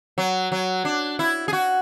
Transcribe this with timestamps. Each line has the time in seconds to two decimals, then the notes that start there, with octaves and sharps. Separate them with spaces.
0.18 F#3
0.52 F#3
0.85 D4
1.19 E4
1.48 G#4
1.53 F#4